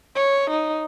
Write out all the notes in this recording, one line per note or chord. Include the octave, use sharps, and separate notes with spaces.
C#5
D#4